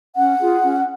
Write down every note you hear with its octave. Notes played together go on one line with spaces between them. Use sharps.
C#4 F#5
F4 G#4
C#4